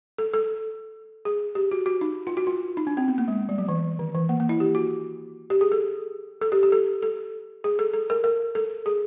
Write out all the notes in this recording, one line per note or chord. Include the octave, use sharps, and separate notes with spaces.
A4
A4
G#4
G4
F#4
F#4
D#4
F4
F#4
F4
D#4
D4
C4
B3
A#3
G#3
G3
F#3
E3
D#3
E3
A#3
A#3
E4
G4
F#4
G4
G#4
A4
A4
G4
G4
A4
A4
G#4
A4
A4
A#4
A#4
A4
G#4